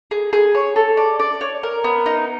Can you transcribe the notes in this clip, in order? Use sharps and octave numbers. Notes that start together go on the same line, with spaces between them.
G#4
G#4
C#5
A4
D5
D5
C#5
A#4
B3
D#4